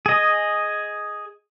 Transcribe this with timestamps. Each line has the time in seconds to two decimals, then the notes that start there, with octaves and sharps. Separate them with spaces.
0.06 G#4 D#5